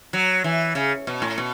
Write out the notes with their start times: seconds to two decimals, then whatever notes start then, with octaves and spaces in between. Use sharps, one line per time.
0.13 F#3
0.44 E3
0.75 C#3
1.07 B2
1.22 A2
1.38 B2